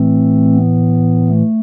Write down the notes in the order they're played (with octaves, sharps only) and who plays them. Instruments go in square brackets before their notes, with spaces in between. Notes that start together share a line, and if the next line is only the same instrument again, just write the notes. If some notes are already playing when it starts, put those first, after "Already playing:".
Already playing: [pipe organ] A2 E3 A3 C4
B3
A3